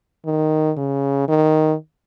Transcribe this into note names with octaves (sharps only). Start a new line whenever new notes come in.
D#3
C#3
D#3